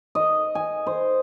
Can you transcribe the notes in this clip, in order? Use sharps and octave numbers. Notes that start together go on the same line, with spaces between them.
D#5
G#5
C5